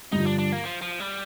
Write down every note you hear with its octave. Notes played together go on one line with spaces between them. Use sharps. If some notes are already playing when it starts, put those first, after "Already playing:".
G2 D3 F3 D#4
D4
D4
A#3
F3
F3
G3